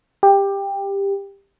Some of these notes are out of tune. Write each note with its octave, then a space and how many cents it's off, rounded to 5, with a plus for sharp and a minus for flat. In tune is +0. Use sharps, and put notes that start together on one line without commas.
G4 +15